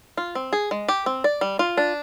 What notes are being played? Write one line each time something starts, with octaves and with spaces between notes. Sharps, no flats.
F4
C4
G#4
G#3
G4
C4
D5
G3
F4
D4